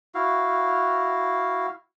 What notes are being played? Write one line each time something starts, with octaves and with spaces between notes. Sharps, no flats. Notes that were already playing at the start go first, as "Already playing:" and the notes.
E4 F#4 F5